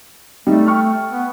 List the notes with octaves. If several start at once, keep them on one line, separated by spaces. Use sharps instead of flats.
G3 A3 D#4
G5 C#6 F6
B3